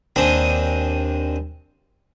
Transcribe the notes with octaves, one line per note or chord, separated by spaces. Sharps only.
D#2 C4 D4 G#5 A#5 D#6